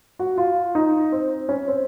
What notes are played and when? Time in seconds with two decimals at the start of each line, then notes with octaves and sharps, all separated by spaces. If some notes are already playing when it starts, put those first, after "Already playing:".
0.19 F#4
0.38 F4
0.75 D#4
1.12 C4
1.49 C#4
1.68 C4